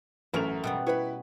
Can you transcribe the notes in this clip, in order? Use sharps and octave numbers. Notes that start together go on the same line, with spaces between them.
A1 F#2 A3 A#4 E5 F7
B2 G3 B3
E4 B4 C#5 B5